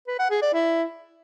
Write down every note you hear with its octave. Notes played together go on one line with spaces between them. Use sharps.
B4
F#5
G#4
D5
E4